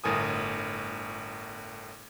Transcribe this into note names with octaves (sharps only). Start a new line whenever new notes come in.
G1 A2 A#4 G#5 D#6